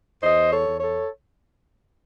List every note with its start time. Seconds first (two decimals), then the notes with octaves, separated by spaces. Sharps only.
0.22 E2 C5 D#5
0.50 A4 C#5
0.65 E2
0.78 A4 C#5